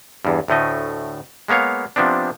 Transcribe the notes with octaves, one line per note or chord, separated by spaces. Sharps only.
E2 G2
D2 A2 A3 D#5
G#3 A#3 B3 C#5 F5
C3 F3 B3 C4 D4